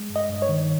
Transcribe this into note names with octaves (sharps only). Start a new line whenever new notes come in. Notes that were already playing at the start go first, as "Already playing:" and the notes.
Already playing: G#3
G2
D#5
G2
C#5
D#3